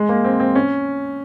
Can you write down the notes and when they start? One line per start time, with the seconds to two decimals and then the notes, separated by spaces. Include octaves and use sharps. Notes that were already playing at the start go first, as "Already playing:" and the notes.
Already playing: G#3
0.09 A#3
0.25 C4
0.40 C4
0.55 C#4